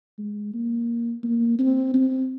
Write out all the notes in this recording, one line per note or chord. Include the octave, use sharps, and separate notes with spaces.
G#3
A#3
A#3
C4
C4